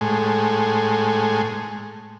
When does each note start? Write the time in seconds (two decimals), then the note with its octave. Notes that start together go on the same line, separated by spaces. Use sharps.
0.01 A2 G#3